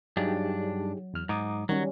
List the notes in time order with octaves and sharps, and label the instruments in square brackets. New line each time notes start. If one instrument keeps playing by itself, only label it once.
[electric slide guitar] G2 D4 [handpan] F#3 [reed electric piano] D#4 G4 G#4
[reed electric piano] E2 F6
[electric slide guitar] G#2 [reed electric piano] A#5 D6 D#6
[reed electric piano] D#3 [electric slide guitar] F#3 [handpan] G3 C#4